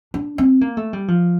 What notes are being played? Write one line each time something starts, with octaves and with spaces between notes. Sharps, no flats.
D4
C4
A#3
A3
G3
F3